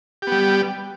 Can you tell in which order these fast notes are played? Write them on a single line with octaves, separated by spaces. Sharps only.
G4 B3 G3